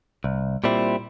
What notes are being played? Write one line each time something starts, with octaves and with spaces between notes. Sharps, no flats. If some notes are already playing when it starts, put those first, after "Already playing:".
C2
A#2 G3 C4 E4